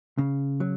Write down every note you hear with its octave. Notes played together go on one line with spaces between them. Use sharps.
C#3
F#3